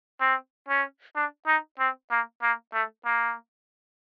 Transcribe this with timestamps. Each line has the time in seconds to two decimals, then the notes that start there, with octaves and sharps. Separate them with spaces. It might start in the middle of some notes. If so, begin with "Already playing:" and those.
0.20 C4
0.68 C#4
1.16 D4
1.47 D#4
1.79 C4
2.11 A#3
2.42 A#3
2.73 A3
3.05 A#3